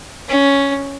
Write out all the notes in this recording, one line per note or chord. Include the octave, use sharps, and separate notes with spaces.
C#4